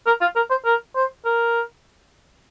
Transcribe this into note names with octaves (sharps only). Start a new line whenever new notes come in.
A#4
F4
A#4
C5
A#4
C5
A#4